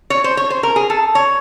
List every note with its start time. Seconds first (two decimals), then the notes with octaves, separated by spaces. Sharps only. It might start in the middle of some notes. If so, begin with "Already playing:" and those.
0.10 C#5
0.24 C5
0.37 C#5
0.50 C5
0.63 A#4
0.76 G#4
0.90 A4
1.15 C#5